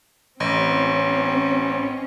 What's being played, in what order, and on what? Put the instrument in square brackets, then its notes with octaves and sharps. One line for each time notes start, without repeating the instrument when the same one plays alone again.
[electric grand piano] A1 [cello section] C4 C#4